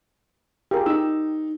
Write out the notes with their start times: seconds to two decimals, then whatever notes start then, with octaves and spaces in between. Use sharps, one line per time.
0.71 F4 G4 G#4 A#4
0.86 D#4 E6